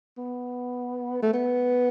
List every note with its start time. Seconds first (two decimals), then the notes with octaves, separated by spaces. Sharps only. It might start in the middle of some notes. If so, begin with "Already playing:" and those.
0.18 B3
1.22 A3
1.33 B3